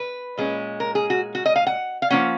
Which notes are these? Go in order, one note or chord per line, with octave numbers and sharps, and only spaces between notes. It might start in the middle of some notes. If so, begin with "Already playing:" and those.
Already playing: B4
A#2 G#3 C#4
A#4
G#4
F#4
F#4
D#5
F5
F#5
F5
F3 A#3 C#4 F#5